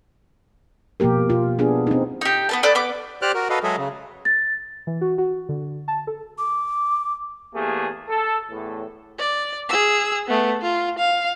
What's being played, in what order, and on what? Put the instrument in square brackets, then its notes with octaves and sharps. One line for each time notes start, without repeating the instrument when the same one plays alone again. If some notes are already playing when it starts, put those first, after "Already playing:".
[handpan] B2 F3 A#3 G4 A#4
B2 F4
B3 D4 G#4
C4 D#4
[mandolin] D#4 G4
B3 B4 A5
A4 B4 D5 D#6
B3 B4 D6
[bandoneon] G4 C5 D5 D6 F6 F#6
F#4 A#4
F#4 A4 B4 D#5 F5
F#3 G#3 G#4 A4 D#5 E5
C#3
[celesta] A6
[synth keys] E3
F#4
F#4
D3
A5
A4
[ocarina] D6
[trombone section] E2 A3 A#3 G4 G#4
A4
E2 A2
[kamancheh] D5
G#4 E6
A3 B3
F4
F5